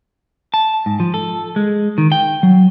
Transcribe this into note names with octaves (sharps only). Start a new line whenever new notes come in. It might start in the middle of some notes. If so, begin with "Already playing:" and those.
A5
G#2
F3
A4
G#3
D#3
G5
F#3